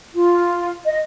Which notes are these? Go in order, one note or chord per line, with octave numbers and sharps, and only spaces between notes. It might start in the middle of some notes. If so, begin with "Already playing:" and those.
F4
D#5